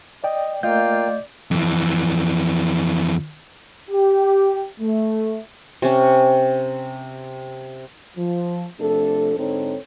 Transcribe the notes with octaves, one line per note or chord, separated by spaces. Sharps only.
D5 D#5 G5
A3 A#3 F4 D5 D#5 G5 G6
F2 E3
G4
A3
C3 C#4
F3
C3 F3 A3 D4 A4
G#2 D3 C4 D#4 A4 C#5